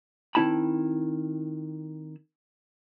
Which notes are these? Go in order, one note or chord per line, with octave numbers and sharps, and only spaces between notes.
D#3 C4 E4 A5 B5